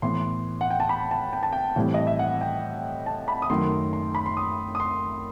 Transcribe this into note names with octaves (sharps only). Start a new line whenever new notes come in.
A2 E3 B3 C6
F#5
G5
A5
B5
A5
G5
A5
G5
A2 E3 G3 C4
D#5
E5
F#5
G5
A5
B5
D#6
F#2 D#3 F#3 A3 C6
C6
B5
C6
D#6
D#6
C6